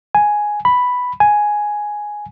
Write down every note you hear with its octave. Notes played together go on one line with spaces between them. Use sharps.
G#5
B5
G#5